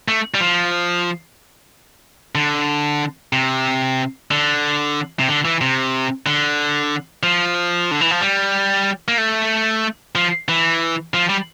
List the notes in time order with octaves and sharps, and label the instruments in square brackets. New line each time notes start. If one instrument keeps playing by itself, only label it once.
[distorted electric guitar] A3
G3
F3
D3
C3
D3
C3
D3
E3
C3
D3
F3
D3
E3
F3
G3
A#3
A3
F3
E3
F3
G3